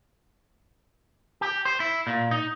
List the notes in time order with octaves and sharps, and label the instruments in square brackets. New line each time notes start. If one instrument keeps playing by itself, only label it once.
[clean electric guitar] G4
C5
E4
A#2
D#4